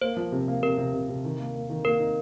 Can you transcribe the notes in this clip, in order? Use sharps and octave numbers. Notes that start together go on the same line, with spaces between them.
A#3 C5
F3
C3
A#3
C3 A#4
C3
C3
C3
D#3
A#3
A#3
D#3
A#3 A#4
D#4